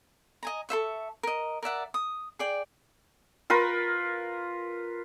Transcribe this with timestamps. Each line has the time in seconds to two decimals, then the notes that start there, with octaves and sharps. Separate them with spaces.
0.43 D#5 G#5 A#5
0.69 A4 C5 E5 C#6
1.23 A#4 D#5
1.63 A#4 D5 E5 F#5
1.94 D#6
2.39 G#4 D5 G5
3.50 F4 A#4 B4